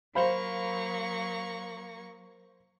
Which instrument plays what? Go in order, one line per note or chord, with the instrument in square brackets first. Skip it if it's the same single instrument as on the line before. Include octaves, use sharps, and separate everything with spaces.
[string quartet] F#3 A#3 C#6 [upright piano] C5 F5 B5